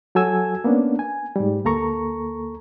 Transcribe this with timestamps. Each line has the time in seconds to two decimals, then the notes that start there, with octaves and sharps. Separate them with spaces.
0.15 F#3 F#4 A4 G#5 E6 G#6
0.64 A#3 B3 C#4 D4
0.99 G#5
1.36 G#2 G3
1.65 D2 A#3 A4 A#5 C#6